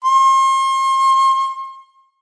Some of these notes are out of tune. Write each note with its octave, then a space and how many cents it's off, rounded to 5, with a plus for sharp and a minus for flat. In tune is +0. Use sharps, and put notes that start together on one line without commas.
C6 +40